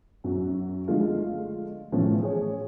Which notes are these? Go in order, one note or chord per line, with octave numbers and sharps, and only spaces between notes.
F#2 F#4
D3 F3 G#3 A3 F4
A2 E3 F3 A3 C#4
G#4 C#5